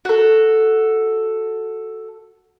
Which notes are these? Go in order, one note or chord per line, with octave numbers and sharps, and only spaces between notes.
F#4 A4